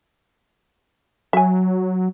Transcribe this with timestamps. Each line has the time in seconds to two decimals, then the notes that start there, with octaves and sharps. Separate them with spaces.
1.33 F#3 E5 G#5